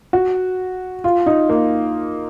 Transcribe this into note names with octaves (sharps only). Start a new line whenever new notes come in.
F#4
F4
D#4
A#3